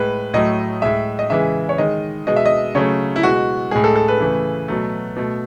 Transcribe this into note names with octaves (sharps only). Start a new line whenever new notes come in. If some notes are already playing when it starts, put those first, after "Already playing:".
Already playing: A2 G#3 B4
A2 F#3 A3 D#5
A2 G#3 E5
D#5
C#3 E3 G#3 E5
C#5
D#3 G#3 D#5
B2 G#3 D#5
E5
D#5
C#3 F#3 A3 C#5
E4
B2 G#3 F#4
A2 G#3 G#4
A4
A4
B4
C#3 E3 A3
B2 F#3 A3
B2 A3